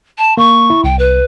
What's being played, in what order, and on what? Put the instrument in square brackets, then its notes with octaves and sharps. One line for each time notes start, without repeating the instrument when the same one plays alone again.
[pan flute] A5
[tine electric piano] A#3 [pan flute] C#6
[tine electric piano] E4
[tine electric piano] C2 [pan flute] G5
[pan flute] B4